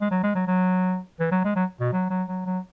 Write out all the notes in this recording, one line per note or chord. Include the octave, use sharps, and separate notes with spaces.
G#3
F#3
G#3
F#3
F#3
E3
F#3
G#3
F#3
B2
F#3
F#3
F#3
F#3